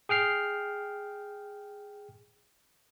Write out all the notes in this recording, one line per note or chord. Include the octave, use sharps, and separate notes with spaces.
G#4 G5 F6 C7